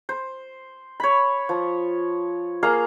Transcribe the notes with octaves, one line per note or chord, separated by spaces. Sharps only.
C5
C#5 B5
F3
A#3 G#4 F5 A#5